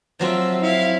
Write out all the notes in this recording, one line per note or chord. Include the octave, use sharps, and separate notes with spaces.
F3 F#3 C4 F4 E5
E4 F5